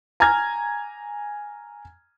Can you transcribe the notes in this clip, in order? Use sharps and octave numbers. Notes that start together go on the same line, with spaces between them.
G#5 A#5 F6 G#6